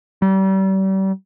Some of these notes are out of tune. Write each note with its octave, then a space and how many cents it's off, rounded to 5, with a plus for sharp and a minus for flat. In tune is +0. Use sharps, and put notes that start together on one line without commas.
G3 -35